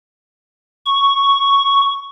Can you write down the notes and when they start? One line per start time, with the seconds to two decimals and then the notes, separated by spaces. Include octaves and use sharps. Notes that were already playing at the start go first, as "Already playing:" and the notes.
0.86 C#6